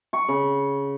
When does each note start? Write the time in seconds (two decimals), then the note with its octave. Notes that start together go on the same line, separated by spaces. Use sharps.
0.13 C#6
0.28 C#3